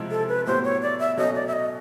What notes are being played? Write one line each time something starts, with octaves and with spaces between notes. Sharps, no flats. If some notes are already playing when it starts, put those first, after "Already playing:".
Already playing: C3 F3 G#3 E4
A4
B4
A2 F#3 B3 E4 G4 C5
C#5
D5
E5
B2 F#3 A3 C#4 D#5
D5
E5
D#5